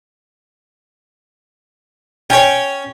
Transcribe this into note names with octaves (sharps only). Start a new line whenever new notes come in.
C#4 C#5 G5